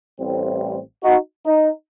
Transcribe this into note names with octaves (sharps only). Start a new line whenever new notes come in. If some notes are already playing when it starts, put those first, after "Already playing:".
A1 A2 G3 C4
D#4 F#4
D#4